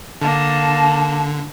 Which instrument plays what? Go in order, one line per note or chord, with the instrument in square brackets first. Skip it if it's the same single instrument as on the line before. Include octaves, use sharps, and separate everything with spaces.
[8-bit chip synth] D3 [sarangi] A#3 [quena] A5